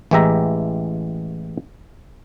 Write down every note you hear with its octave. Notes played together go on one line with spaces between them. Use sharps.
A1 E3 G#3 G4 E5 A#5